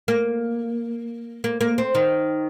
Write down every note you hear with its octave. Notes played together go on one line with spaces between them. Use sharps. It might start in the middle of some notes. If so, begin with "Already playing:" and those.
A#3
A#3
A#3
C4
D#3